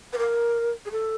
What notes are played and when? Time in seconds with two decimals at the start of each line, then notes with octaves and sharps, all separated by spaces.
0.12 B4
0.18 A#4
0.85 G#4
0.91 A4